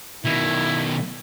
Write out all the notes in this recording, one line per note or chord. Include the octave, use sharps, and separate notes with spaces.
B2 D#3 E4